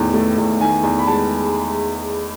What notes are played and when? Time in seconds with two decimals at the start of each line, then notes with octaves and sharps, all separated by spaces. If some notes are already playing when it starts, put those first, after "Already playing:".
Already playing: E2 A2 D#3
0.14 A3
0.37 E2
0.61 D#3 G#5
0.83 E2
0.98 B5
1.07 G#3 A5